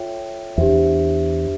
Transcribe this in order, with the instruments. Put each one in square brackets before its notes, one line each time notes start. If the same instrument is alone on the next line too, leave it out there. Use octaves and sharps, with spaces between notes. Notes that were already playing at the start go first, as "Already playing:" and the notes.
Already playing: [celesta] F4 A4 C#5 E5 G5
[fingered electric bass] E2 [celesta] D4 G4 C5 E5